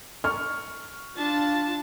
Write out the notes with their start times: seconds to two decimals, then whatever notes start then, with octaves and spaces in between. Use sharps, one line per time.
0.24 C#6 F6
1.16 D4 F4 A5